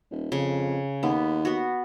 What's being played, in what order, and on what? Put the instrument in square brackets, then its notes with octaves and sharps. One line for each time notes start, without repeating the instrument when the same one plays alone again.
[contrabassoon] D#1
[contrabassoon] F2 [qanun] C#3
[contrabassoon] D#2 [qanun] B3
[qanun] B3 F#4